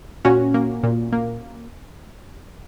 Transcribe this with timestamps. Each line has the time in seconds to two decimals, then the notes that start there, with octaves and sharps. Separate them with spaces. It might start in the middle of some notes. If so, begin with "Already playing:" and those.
0.25 A#2 C#4 F#4
0.54 A#3
0.83 A#2
1.12 A#3